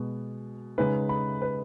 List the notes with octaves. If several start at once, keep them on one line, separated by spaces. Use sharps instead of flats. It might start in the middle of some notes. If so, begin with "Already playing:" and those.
Already playing: B2 G#3 B3
C#3 G#3 D#4 B4
B5
B4